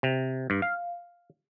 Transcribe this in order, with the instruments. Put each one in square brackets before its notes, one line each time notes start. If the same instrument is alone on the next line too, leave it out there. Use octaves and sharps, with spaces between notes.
[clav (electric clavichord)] C3
G2
F5